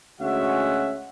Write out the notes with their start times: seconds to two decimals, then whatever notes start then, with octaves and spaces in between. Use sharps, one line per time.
0.21 D2 G#3 C#4 F#4 E5 F#5